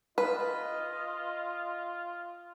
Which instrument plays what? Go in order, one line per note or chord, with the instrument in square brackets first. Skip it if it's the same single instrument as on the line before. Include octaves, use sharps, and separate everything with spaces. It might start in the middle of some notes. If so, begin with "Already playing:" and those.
[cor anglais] F4 [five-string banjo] B4 [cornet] D#5